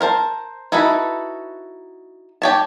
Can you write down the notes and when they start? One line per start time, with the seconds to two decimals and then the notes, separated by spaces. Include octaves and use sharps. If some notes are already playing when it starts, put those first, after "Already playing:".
0.01 A#4 C5 A5
0.72 D#4 E4 F#4 A4 B4
2.42 G4 C#5 A5